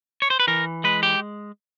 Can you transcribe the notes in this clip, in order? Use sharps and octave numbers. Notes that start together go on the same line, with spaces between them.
C#5
C5
B4
E3 A#4
G#3 B4
G4